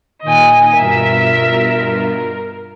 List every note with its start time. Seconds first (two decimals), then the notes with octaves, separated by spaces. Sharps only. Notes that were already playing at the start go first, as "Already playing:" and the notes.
0.22 A#2 D#3 D#5 G#5
0.74 G2 B2 F4 A#4 E5